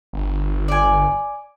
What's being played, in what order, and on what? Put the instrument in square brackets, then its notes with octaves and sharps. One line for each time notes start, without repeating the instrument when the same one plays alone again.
[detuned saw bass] G1
[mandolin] D5 G#5